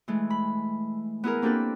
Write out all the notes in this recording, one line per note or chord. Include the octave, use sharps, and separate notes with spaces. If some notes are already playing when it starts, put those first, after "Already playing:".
E3 G#3 A3
B5
B3 E4 G#4 A#4
A#3 C4 D4 G4 A4 B4